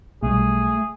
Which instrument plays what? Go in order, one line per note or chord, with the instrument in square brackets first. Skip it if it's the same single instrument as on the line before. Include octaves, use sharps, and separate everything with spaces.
[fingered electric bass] B1 G3 [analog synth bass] A3 [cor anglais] G#4